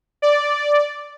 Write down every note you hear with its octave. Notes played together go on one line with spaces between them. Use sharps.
D5